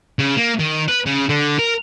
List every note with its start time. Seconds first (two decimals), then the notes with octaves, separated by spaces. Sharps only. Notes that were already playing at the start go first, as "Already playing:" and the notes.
0.19 C#3
0.37 A#3
0.59 D#3
0.89 B4
1.06 C#3
1.29 D3
1.59 A#4